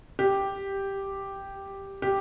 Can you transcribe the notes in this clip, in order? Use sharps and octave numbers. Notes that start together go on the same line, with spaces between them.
G4
G4